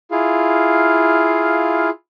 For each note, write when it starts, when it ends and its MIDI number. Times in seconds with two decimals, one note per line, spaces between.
0.11 1.90 64
0.11 1.90 65
0.11 1.90 68
0.11 1.90 77